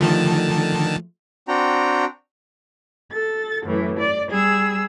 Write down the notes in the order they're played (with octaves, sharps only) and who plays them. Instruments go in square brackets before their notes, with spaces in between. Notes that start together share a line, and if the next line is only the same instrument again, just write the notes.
[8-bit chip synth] D3 D#3 A5 [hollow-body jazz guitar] F3 A3
[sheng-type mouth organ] C4 D4 F#4 G5 A#5
[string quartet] A4 A6
F#2 A2 E3
D5
G3 G#4 E6